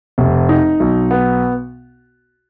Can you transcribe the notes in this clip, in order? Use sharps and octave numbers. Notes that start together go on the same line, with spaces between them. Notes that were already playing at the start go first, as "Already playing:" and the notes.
F1
D#4
B1
B3